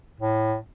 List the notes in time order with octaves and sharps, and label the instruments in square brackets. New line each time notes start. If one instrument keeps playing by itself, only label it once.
[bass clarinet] A2